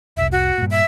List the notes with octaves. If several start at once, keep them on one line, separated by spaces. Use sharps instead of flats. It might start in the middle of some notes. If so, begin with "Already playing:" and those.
F1 C2 E5
F#4
G2 A#2
E5